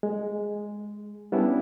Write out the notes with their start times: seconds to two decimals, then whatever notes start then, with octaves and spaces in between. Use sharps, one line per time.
0.03 G#3
1.32 G3 B3 C#4 D4 E4